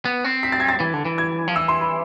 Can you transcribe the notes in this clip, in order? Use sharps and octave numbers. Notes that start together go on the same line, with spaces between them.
B3
C4
B6
A6
G#6
A6
E3
D3
E3
G#6
F3
E3 E6
C6
B5